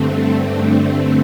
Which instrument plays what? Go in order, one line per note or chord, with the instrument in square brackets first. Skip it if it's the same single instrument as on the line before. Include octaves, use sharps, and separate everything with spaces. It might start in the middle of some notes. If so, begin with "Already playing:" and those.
Already playing: [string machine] G2 D3 A3 C4